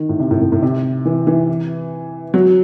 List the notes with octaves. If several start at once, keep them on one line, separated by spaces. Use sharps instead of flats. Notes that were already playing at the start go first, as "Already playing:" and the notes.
Already playing: D#3
A2
C3
A2
A2
A2
C3
E3
E3
F#3